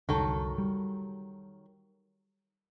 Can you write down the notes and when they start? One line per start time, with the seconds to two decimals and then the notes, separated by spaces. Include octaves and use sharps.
0.09 F1 C2 D3 D#3 F#3 A4
0.58 G3